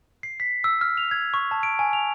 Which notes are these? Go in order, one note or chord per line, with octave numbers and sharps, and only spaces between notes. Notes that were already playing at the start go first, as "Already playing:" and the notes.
C7
B6
E6
F6
F7
G#6
C#6
A5
D7
G#5
F7